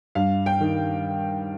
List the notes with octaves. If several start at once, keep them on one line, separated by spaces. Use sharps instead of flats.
G2 F5
G5
D#3